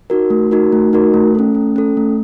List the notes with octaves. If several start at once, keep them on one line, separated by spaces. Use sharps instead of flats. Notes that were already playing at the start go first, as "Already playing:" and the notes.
D#4 F#4 A#4
A3
D#4 F#4 A#4
A3
D#4 F#4 A#4
A3
C#4 A4
A3
C#4 A4
A3